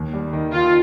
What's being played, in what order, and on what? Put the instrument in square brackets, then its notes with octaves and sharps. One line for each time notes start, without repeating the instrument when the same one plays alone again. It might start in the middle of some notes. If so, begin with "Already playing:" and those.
Already playing: [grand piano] D#2
G3
D#3
[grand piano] D#3 [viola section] F4